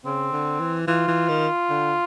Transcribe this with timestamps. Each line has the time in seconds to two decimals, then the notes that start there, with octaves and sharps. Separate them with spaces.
0.05 C#3 C4
0.33 D3
0.60 E3
0.88 E3 F4
1.08 E3
1.29 D#3
1.70 D3